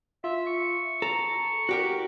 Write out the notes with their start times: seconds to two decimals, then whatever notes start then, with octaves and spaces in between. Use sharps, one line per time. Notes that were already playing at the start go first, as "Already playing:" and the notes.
0.24 F4 E5
0.47 C#6
1.02 A4 A#5
1.69 F#4 G4 A#4